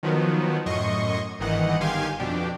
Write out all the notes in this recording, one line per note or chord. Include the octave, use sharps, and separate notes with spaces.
D#3 F3 F#3 B3
F#2 A2 D#5 C6 C#6
G1 G#2 D#3 E3 D#5 F#5
G1 D#3 G4 F5 G#5 C6
F2 B2 D4 G4